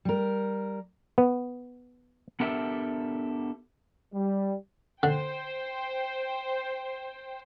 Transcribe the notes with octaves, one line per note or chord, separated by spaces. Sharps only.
G3 A#4
B3
B3 D4 G4 A4 A#4 E5
G3
D3 C5 G5